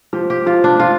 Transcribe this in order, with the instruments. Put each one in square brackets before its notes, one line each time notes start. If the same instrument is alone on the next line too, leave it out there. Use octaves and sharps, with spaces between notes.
[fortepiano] F3 [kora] G4
[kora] G4
[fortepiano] F3 [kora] F4
[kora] D4
[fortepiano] F3 [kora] F4